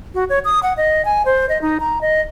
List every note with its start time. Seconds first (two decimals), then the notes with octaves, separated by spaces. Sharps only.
0.15 F#4
0.29 C#5
0.45 D#6
0.63 F#5
0.77 D#5
1.05 G#5
1.26 C5
1.49 D#5
1.62 D#4
1.80 A#5
2.01 D#5